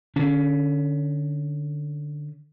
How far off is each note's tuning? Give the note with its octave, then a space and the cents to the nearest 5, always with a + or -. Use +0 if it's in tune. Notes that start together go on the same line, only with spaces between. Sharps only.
D3 +15 C#4 +20